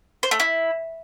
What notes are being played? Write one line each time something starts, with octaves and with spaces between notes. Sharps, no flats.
C5
A3
E4